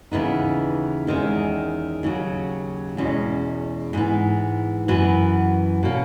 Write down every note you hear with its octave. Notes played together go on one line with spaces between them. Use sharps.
D#2 C#3 E3 B3 D#4
E2 D#3 G#3 C#4
D#2 C#3 F#3
E2 B2 G#3 C#4
G#2 E3 B3
F#2 E3 B3 F#4 B4
B2 A#3 C#4